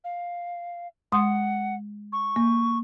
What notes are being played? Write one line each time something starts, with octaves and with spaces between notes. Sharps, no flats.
F5
G#3 F#5 C6 D#6
C#6
A#3